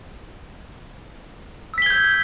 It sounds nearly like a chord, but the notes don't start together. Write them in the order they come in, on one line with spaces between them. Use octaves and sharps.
E6 B6 G7 G#6 G6